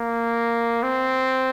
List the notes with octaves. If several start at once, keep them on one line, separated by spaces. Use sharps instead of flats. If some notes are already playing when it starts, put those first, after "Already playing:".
Already playing: A#3
C4